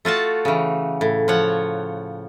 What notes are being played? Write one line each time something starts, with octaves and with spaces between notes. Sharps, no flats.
A3 F4 F#4 A5
C#3 E3
A2
F3 C#5 F#5